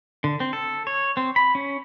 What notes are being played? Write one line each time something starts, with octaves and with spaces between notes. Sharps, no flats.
D3
C4
A4
C#5
C4
B5
C#4